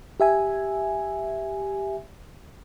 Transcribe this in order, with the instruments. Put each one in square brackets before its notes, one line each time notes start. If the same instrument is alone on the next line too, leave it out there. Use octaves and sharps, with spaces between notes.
[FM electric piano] G4 E5 G#5